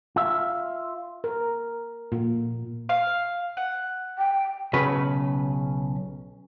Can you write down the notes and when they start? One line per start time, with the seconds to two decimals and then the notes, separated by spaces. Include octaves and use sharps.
0.16 F4 E5
1.24 A#4
2.12 A#2
2.89 F5
3.57 F#5
4.18 G5
4.73 B1 C#3 B4